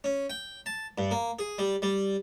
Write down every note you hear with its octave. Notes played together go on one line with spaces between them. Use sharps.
C#4
G5
A5
G2
A#3
G#4
G3
G3